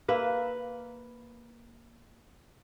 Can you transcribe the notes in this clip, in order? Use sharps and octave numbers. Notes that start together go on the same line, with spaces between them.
A#3 B4 E5